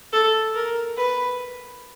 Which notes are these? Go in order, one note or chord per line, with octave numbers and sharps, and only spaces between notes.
A4
A#4
B4